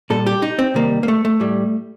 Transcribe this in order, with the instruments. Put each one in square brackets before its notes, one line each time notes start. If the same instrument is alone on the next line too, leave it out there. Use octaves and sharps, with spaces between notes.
[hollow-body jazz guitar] A#2 G3 A4
G4
D#4
C4
C3 D#3 G3 A#3
A#3
A3
A3
A2 G3